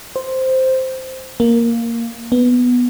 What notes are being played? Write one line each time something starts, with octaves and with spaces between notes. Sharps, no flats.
C5
A#3
B3